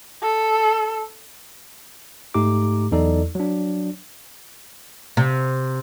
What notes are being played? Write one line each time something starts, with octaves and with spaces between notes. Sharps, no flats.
A4
G#2 A3 D#4 G4 A#5 D6
E2 F#3 D#4 A4 D5
F#3 D4
C3